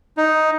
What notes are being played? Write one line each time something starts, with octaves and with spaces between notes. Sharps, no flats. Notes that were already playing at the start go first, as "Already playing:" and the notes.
D#4